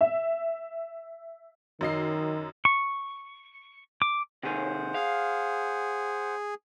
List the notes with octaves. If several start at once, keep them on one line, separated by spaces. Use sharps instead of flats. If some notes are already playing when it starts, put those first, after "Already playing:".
E5
F#2 D#3 D#5 C7
C#6
D6
C3 D#3 G#4 C5 F#5
G#4 F5